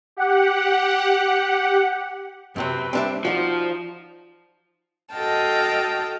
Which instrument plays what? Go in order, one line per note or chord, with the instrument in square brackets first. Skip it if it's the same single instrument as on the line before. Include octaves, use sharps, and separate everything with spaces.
[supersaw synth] G4 F#5
[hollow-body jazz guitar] F#2 C3 F#3 [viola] C4 B4
[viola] G3 [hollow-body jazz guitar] C4 D4 E5
[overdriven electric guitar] F3 [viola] D#4 [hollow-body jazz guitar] F#4 D5
[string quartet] F#4 A4 D#5 F5 G5 A5